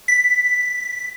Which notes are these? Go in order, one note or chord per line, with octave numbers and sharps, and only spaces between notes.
B6